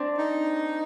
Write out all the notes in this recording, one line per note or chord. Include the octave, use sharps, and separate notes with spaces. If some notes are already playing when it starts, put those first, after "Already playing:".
Already playing: C4 D4
D#4